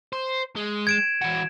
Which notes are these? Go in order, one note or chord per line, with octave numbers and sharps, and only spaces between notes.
C5
G#3
G#6 D7 E7
E3 F#4